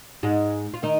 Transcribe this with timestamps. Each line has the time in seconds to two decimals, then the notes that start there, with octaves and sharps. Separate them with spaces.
0.23 G#2 G#3
0.74 F4
0.83 D#3 D#4